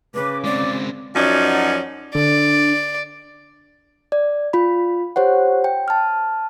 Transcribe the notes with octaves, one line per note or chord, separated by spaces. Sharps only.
C#3 B4 D6
G#3 C4 D5
F#2 F3 F#3 C#4 D#4 D5
D3 D5
D5
F4 B5
G4 C5 C#5 F#5
G5
A5 F6